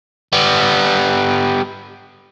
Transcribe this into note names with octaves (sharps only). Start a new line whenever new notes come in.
G3 B3